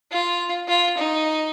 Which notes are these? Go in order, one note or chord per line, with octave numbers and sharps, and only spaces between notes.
F4
F4
D#4